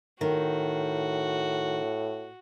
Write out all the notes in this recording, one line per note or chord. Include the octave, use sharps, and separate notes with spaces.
A2 D#3 F#4